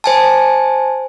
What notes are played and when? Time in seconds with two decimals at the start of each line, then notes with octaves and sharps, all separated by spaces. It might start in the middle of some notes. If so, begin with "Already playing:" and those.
0.04 C5 G#5 A5